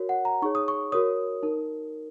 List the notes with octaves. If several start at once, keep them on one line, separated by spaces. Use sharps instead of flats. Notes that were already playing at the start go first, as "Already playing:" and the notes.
Already playing: F#4 A#4 C#5
F#5
A#5
D#4 G#4 C#5 C#6
D#6
C#6
F#4 A#4 C#5 D#6
D#4 A#4